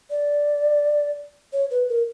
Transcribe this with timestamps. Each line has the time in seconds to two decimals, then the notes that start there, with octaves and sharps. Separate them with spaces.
0.10 D5
1.53 C#5
1.71 B4
1.89 A#4